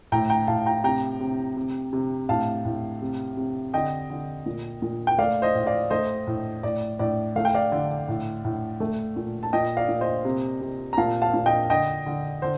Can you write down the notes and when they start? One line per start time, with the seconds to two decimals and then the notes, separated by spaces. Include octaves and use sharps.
0.12 A2 G5 A#5
0.30 G5 A#5
0.47 A2 F5 A5
0.66 G5 A#5
0.84 C3 G5 A#5
1.20 C3
1.57 C3
1.93 C3
2.29 A2 F5 A5
2.65 A2
3.02 C3
3.37 C3
3.74 D3 D#5 G5
4.10 D3
4.46 A#2
4.82 A#2
5.07 G5
5.18 A3 D5 F5
5.42 C5 D#5
5.55 A2
5.67 D5 F5
5.90 A3 C5 D#5
6.27 A2
6.63 A2 D5
6.99 A2 D5
7.36 A3 F5
7.45 G5
7.55 D5 F5
7.72 D3
8.08 A2
8.45 A2
8.80 A3
9.16 A#2
9.43 A5
9.53 A#2 D#5 G5
9.77 D5 F5
9.89 A#2
10.01 C5 D#5
10.25 C3
10.61 C3
10.93 A#5
10.97 A#2 F5 A5
11.22 F5 A5
11.34 A#2
11.46 D#5 G5
11.70 D3 D#5 G5
12.06 D3
12.42 D3 C5